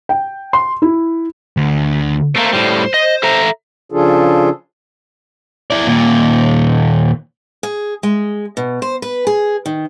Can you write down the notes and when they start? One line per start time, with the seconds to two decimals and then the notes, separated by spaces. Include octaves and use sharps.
0.09 G5
0.53 C6
0.82 E4
1.57 D2
2.36 A3 A#3 C5
2.53 A2 G3
2.94 D#5
3.23 A4 E5 A#5
3.92 C#3 F3 D4 F4 G#4 A4
5.71 E4 D5
5.86 D#2 A#2
7.63 G#4
8.03 G#3
8.57 B2
8.82 C5
9.02 B4
9.27 G#4
9.66 D#3